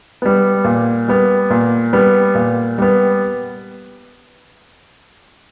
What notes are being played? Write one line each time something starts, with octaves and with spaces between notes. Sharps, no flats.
G3 B3
A#2
G3 B3
A#2
G3 B3
A#2
G3 B3